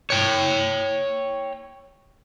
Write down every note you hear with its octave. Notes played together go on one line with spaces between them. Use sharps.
C#5 G5